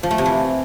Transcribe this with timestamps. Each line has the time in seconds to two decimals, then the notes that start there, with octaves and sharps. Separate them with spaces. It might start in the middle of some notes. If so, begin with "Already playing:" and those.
0.03 F3
0.11 A3
0.18 C3
0.26 E3